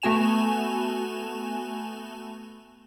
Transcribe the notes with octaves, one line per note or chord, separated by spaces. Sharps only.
A3 B3 F#4 G#5 E7 F7